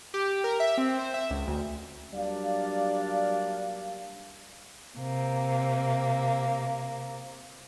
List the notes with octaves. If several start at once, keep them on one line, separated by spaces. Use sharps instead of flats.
G4
A#4
E5
C4
C5
E5
C#2
D2
F#3 G3 A#3 D4 D5 F5
C3 A#3